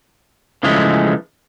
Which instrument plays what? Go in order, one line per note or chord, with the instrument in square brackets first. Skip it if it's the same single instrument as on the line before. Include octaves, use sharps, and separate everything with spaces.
[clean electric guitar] C#3 E3 F3 G#3 A3